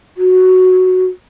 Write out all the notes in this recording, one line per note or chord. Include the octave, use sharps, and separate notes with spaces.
F#4